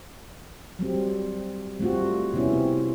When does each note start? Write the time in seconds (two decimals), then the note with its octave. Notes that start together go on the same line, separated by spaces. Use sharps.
0.79 F#3 G3 C4
1.80 G3 A3 C4 F4 F#4
2.34 C3 B3 C#4 E4
2.53 C4